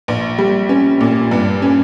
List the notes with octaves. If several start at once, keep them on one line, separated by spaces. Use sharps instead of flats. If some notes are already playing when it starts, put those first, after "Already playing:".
A#1
G3
C#4
A#2
G2
C#4